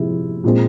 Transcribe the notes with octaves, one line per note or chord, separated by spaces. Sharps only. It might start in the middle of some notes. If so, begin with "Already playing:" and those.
Already playing: C3 F3 G#3 E4
A#2 G#3 C4